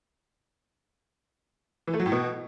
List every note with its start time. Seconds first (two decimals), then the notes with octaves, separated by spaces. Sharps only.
1.87 E3
1.94 A3
2.00 F#3
2.06 A2
2.12 B2